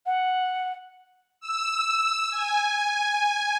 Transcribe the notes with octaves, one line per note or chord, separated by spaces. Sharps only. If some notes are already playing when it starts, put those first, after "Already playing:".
F#5
E6
G#5